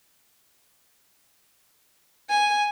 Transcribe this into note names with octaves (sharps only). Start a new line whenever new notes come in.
G#5